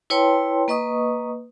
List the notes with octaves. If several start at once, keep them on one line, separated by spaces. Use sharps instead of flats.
E4 B4 C#5 G5 A5 C6
A#3 B4 D#5 C#6 D#6